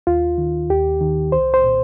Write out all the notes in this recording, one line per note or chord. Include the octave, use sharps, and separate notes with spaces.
D#2 F4
D#3
D#2 G4
D#3
C2 C5
C5
A#2